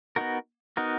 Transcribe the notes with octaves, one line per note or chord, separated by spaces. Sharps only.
B3 D#4 F#4 A#4
B3 D#4 F#4 A#4